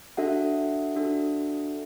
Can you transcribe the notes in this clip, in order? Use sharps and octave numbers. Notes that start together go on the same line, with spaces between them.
D4 F#4 A4 E5 F#5
D4 F#4 A4